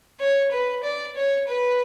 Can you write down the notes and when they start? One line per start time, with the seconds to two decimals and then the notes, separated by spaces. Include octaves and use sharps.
0.20 C#5
0.52 B4
0.83 D5
1.16 C#5
1.47 B4